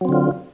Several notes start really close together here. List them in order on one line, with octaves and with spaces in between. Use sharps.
F#3 C4 D3 F4